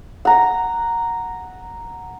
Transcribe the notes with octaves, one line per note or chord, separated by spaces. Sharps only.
F#5 A#5